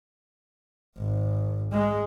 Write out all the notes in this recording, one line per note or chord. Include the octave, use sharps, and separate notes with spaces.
G#1
G#3